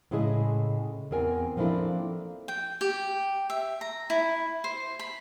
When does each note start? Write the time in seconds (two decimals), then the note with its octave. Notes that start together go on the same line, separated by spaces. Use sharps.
0.11 A2 C#3 G#3 E4 G#4 D#5
1.11 E2 C4 A#4 G#5
1.57 F3 A#3 C4 D4 E4 A4
2.48 G5
2.81 G4
3.50 E5
3.81 A#5
4.10 E4
4.64 C5
4.99 B5